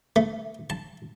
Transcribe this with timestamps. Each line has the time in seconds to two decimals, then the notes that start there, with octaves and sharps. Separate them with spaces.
0.16 A3
0.70 A5